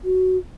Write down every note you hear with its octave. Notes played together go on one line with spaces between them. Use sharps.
F#4